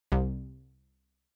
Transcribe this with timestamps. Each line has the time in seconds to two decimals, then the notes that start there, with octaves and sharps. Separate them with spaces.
0.12 C2